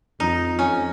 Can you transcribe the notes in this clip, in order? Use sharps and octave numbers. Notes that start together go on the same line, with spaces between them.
F2 D#4
C#4